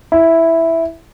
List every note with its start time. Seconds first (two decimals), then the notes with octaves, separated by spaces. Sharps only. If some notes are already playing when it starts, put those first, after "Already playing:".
0.12 E4